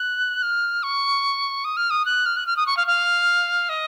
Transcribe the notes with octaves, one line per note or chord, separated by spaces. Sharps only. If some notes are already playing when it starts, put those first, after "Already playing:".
Already playing: F#6
F6
C#6
D#6
F6
D#6
F#6
F6
F#6
F6
D#6
C#6
F5
F5
D#5